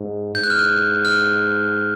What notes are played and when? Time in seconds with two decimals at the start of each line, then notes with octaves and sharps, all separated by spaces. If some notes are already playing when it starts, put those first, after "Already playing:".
Already playing: G#2
0.35 G#2 G6
0.43 F#6
0.50 F6
0.59 F#6
1.05 F6